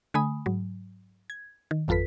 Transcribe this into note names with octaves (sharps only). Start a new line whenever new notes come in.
D3 A3 G#5 B5 D#6
G#2 F#3
G#6
D#3
G#1 F2 F4 A4 B4 B6